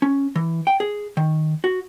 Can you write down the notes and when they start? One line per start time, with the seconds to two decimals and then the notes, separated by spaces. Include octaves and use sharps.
0.02 C#4
0.36 E3
0.67 G5
0.80 G#4
1.17 D#3
1.64 F#4